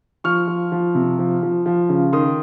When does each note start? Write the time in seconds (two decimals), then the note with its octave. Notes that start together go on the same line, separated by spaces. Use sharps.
0.24 F3 C#6 F6
0.48 F3
0.72 F3
0.95 C3
1.19 F3
1.43 F3
1.66 F3
1.89 C#3
2.13 D#3 C6 D#6